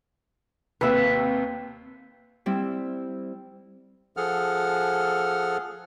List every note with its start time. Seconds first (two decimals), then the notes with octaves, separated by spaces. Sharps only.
0.81 D#2 C3 B4 E5
2.46 G3 C4 E4
4.17 F3 G#4 A4 F#5 F6